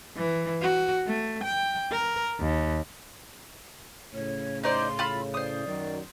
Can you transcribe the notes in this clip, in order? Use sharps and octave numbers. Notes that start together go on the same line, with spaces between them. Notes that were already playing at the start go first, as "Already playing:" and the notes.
E3
F#4
A3
G5
A#4
D#2
A2 C#3 C#5
D#4 C5 D5 C6
F4 B5 E6
C5 D5 D#6
F#2 D#3 F#3